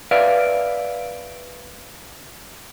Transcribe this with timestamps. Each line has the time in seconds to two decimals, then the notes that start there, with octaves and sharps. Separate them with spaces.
0.11 B4 D5 E5 F5